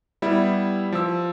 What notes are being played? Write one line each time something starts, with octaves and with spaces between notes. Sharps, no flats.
G3 B3 E4
F3 E6